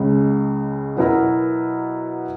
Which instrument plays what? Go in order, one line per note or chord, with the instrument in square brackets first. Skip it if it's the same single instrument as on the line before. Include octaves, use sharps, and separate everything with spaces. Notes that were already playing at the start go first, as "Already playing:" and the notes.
Already playing: [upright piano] C#2 C#3 G#3
B2 F#3 B3 E4 A#4